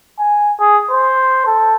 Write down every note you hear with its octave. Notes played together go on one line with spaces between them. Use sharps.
G#5
G#4
C5
A4